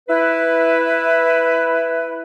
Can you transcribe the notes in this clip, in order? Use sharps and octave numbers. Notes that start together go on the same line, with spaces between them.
E4 B4